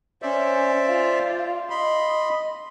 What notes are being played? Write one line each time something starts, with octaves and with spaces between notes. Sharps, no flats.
C#4 C5 D5 E5
F4
D#5 B5 C6